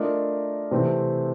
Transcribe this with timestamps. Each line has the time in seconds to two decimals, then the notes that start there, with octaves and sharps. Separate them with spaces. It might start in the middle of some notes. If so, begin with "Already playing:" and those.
Already playing: A3 D4 F4 A#4 D#5
0.71 C3 E3 A3 C4